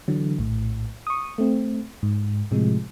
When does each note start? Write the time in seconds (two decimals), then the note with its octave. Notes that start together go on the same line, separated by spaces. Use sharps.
0.08 D3 E3 F#3
0.39 A#1 A2
1.07 C#6 D#6
1.38 A3 C4
2.03 G#2
2.51 A2 C3 F3 G#3